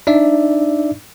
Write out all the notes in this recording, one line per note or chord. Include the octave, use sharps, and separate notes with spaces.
D4 D#4 D5 E5